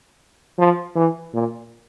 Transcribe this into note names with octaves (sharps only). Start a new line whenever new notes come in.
F3
E3
A#2